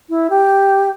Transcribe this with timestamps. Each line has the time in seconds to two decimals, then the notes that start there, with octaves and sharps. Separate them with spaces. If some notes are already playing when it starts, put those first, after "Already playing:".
0.09 E4
0.30 G4